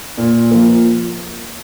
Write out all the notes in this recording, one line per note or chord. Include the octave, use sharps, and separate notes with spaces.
A#2
F3 A#3